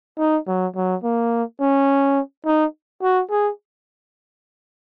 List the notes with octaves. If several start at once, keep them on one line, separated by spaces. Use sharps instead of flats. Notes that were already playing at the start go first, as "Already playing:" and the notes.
D#4
F#3
F#3
A#3
C#4
D#4
F#4
G#4